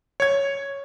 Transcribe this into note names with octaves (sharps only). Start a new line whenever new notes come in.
C#5 G#6